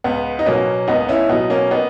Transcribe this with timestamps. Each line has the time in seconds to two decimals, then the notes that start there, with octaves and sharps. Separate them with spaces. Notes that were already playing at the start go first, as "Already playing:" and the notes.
0.04 C#2 B3
0.39 D#4
0.46 B2 F#3 A#3 C#4
0.88 C#2 B3 D#4
1.09 C#4 E4
1.29 B2 F#3 B3 D#4
1.50 A#3 C#4
1.71 B3 D#4